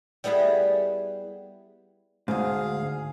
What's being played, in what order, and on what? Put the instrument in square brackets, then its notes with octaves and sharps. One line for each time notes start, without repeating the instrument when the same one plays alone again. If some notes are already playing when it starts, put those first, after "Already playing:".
[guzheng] G3 B3 E4 G#4 B4
[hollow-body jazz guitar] D2 G#2 [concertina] G#4 F5